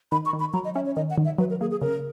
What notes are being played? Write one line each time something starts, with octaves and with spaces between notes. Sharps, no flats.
D#3 B5
C#6
D#3
B5
F#3 A#5
D#5
C#4 E5
C#5
D#3 D#5
F#5
D#3
E5
F#3 B4
A#4
A#3 G#4
G#4
C#3 A#4